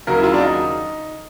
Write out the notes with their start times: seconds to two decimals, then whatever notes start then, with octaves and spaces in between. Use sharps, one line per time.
0.07 D#2 C#3 F#3 A#4
0.18 E4
0.24 F4
0.33 D4
0.41 D#4